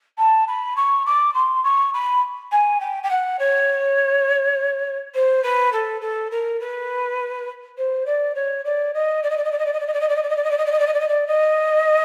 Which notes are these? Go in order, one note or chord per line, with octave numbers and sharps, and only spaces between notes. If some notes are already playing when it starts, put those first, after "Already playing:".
A5
B5
C#6
D6
C6
C#6
B5
G#5
G5
G5
F#5
C#5
C5
B4
A4
A4
A#4
B4
C5
D5
C#5
D5
D#5
D5
D#5
D5
D#5
D5
D#5
D5
D#5
D5
D#5
D5
D#5
D5
D#5
D5
D#5
D5
D#5
D5
D#5
D5
D#5
D5
D#5
D5
D#5
D5
D#5